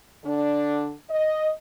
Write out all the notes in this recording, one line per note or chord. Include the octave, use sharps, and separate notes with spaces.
D3 D4
D#5